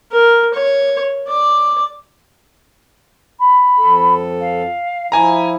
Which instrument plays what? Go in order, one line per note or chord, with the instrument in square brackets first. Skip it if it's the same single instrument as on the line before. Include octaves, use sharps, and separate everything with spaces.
[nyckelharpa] A#4
C#5
D5
[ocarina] B5
[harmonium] F2 A4
[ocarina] F5
[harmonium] F3 E4 [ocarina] E5 [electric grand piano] G#5 A#5